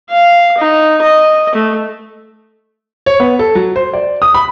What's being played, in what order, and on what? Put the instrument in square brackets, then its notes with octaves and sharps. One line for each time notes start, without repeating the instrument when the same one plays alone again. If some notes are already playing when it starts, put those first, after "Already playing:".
[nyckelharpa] F5
D#4
D#5
A3
[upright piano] C#5
B3
A4
F#3
C5
D5
D#6
B5